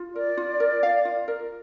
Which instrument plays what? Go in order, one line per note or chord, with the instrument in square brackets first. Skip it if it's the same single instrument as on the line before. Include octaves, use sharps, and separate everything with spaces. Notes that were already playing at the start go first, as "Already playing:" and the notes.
Already playing: [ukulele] F4
[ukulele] A#4 [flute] D5
[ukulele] F4
A#4
F5
F4
A#4